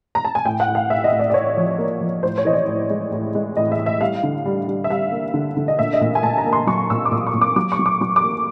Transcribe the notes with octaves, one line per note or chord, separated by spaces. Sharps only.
A#5
A5
G#5
A2 G5
F#5
A2
F5
A2 E5
D#5
A2
D5
D5
A2 C#5
F3
A#3
F3
A2 C5
C#5
E3 D#5
D5
A2
G#3
A2
G#3
A2 D#5
E5
A2
E5
G3 F5
D3
G3
G3
E5
G3 F5
A#3
D3
D3
D#5
A#2 E5
D#5
A#2
G#5
A#2 A5
A#5
A#3
C6
F#3 C#6
A#2 E6
D6
A#2 D#6
C#6
A#2
D6
F#3 D6
C#6
F#3
D6
F#3 C#6
D6
A#3